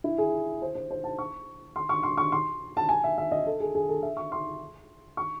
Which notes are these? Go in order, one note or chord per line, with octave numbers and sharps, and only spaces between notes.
E4
G#4
C5
C5
C5
A5
C#6
C6
C#6
C6
C#6
C6
A5
G#5
E5
E5
D#5
A4
G#4
G#4
A4
E5
C#6
C6
C#6